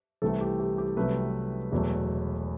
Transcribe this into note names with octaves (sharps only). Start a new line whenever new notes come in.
C2 C3 E3 A3 A4
G4
G4
G4
C2 C3 F#3 A3 B4
E1 E2 B2 F#3 A3